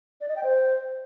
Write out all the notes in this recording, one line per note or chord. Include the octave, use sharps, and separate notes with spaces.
D5
D#5
G5
C5